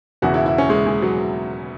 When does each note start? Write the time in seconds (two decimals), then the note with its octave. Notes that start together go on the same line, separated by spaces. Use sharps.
0.22 E1 E2 C#3 E3 F#4
0.34 E4
0.46 E4
0.58 C#4
0.70 G#3
0.86 G#3
1.02 F#3